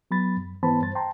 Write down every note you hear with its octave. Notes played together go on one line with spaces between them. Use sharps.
F#3 B3 B5 A6
F#2
G#2 E3 B3 C5 A5 B5
G2 C5 A6
G5 A5 A#5 C6